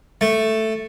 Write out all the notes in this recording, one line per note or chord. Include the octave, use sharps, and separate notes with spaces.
A3